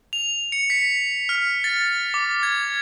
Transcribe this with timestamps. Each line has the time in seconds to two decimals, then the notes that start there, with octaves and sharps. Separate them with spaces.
0.13 F7
0.52 C#7
0.70 B6
1.29 F6
1.64 A6
2.14 D6
2.43 G#6